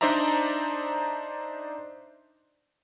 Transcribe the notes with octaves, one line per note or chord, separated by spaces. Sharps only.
D4 D#4 C5 D5 E5 A#5